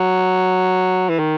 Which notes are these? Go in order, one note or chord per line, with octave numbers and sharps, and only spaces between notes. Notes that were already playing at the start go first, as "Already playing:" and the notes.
Already playing: F#3
E3
D#3